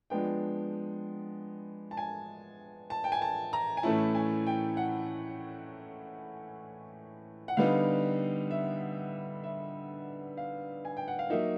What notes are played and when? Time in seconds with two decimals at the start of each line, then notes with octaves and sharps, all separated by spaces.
0.10 F3 G#3 B3 D4 G5
1.91 A5
1.97 G#5
2.90 A5
3.04 G5
3.12 G#5
3.22 A5
3.53 A#5
3.77 G#5
3.83 A2 E3 A3 C#4 E4 A5
4.15 G#5
4.47 G5
4.77 F#5
7.48 F#5
7.57 D3 G3 B3 D#4 F5
8.51 E5
9.44 E5
10.37 F5
10.85 G#5
10.97 G5
11.08 F#5
11.19 F5
11.30 F#3 A#3 D#4 E5